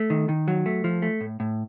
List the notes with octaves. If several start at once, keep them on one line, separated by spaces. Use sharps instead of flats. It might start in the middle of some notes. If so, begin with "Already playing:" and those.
Already playing: A3
D#3
D#3
F#3
A3
F3
A3
A2
A2